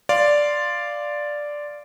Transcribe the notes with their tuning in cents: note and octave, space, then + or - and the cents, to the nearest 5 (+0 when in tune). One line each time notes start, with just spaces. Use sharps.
D5 +0 F5 -5 C6 +0